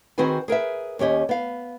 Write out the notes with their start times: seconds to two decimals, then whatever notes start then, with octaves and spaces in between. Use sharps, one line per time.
0.18 D#3 C4 F#4 G#4 B4 G#5
0.48 G#4 A#4 B4 E5
0.99 D#2 C#4 G4 D#5
1.29 B3 F5